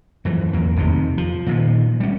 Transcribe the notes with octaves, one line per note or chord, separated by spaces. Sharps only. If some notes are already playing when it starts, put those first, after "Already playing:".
F#2 E3 F3
E2 A#3
F1 C3 D#3
F3
A#2 D#3 F3
G3 C#4